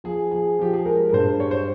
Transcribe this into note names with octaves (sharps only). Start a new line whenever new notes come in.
F3 G#4
F3 G#4
F3 G4
G#4
G#3 A#4
A#4
G2 C5
G3 C#5
C5